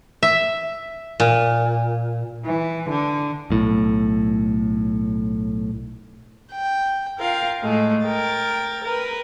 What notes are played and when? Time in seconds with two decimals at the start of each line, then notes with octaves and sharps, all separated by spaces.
0.23 E5
1.20 A#2
2.45 E3
2.90 D3
3.50 B1 A2
6.50 G5
7.19 F4 A#4 F5 G5
7.61 A2 G#3 A3
8.05 A#4 G5 A6
8.84 A#4 B4